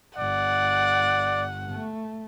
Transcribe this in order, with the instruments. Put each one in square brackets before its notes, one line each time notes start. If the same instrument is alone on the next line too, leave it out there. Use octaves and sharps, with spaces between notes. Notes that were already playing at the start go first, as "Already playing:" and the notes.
[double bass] G1 [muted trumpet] D5 [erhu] F#5
[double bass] A3